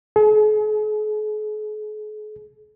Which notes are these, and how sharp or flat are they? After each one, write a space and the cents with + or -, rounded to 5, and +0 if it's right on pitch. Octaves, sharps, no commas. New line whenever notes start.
G#4 +45